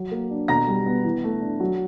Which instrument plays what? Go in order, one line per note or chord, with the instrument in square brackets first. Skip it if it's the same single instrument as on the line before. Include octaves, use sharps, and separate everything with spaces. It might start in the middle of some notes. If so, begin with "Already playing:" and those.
Already playing: [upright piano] F#3
A#3
D4
B2 A#5 A#6
G3
B3
E3
A3
D4
F#3